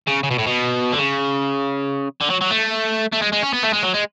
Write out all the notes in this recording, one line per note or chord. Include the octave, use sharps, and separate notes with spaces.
C#3
C#3
B2
A2
B2
D3
C#3
D3
F#3
F#3
A3
A3
G#3
G#3
C#4
B3
A3
G#3
F#3
G#3